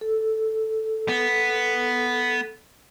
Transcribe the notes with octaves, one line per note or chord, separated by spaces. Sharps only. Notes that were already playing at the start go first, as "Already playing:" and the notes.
A4
B3